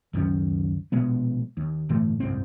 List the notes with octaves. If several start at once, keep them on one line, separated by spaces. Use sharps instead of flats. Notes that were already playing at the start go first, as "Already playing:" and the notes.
C#2 F#2 D#3 C#4
A#1 B2 G#3 B3
D#2
G1 A2 E3 A3
F#1 C2 G#2 C4